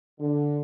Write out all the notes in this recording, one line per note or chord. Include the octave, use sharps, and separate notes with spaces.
D3